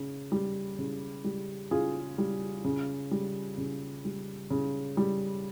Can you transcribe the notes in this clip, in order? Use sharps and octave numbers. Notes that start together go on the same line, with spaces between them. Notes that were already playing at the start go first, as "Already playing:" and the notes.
Already playing: C#3
G3
C#3
G3
C#3 F4 G#4
G3
C#3
G3
C#3
G3
C#3
G3